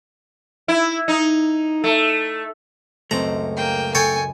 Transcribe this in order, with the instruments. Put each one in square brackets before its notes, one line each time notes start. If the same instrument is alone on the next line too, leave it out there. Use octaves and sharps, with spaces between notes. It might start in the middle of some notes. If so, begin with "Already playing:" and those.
[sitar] E4
D#4
A3
[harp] C#2 F#2 [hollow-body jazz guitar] A3 C4 [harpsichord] A#5
[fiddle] A#3 G5
[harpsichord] A4 C#5 G5 [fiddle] G#5